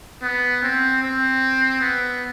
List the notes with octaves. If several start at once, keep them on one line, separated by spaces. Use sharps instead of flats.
B3
C4
C4
B3